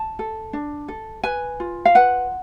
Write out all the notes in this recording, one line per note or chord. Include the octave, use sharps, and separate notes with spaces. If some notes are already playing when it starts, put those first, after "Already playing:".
Already playing: A5
A4
D4
A4
B4 G#5
F4
F5
B4 F#5